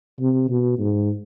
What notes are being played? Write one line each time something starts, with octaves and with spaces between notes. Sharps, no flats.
C3
B2
G#2